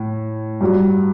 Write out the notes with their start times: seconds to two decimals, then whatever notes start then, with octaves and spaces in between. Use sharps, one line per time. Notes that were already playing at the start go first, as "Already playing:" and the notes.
Already playing: A2
0.61 G2 F#3